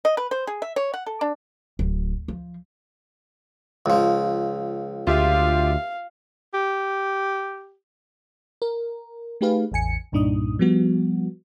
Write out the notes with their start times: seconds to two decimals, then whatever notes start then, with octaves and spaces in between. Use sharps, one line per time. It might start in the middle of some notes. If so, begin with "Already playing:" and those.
0.05 D#5
0.17 B4
0.31 C5
0.47 G#4
0.62 E5
0.76 C#5
0.94 F#5
1.06 A4
1.21 D4
1.79 D1
2.28 F3
3.86 C#2 F3
5.07 D2 F4 G4 E5 F5
6.54 G4
8.62 A#4
9.41 A3 D#4 G4 G#4 B4 F5
9.72 A1 E2 G#5 C#7
10.12 C2 G2 A#2 D4 D#4 D#6
10.59 F3 G3 B3 F#4